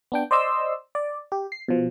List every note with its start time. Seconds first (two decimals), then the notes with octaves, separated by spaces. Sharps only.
0.12 B3 D4 G5
0.31 C5 D5 D#5 C6 E6
0.95 D5
1.32 G4
1.52 C7
1.68 B2 F3